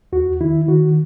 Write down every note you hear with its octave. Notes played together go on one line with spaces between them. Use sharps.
E2 F#4
D#3 E4
D#3 F#4